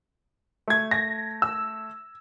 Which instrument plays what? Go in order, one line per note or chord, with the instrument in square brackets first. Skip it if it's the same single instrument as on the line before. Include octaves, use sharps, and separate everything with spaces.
[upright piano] A3 G#6
[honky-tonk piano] A#6
E6